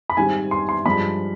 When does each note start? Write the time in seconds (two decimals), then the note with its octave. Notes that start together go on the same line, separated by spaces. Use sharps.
0.10 B5
0.17 G#2 D#3 G3 C4 G#5
0.51 C6
0.69 C6
0.86 G2 F3 G#3 B5